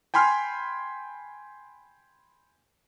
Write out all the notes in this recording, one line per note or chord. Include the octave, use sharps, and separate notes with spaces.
G5 G#5 B5 C6 F6